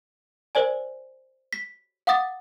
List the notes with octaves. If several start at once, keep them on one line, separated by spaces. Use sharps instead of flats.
A#4 C5 D5 G#5
B6
F5 F#5 D6 D#6 A6